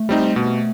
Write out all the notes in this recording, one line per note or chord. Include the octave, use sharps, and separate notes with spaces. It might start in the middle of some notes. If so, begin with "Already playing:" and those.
Already playing: A3
G3 C4 D#4
B2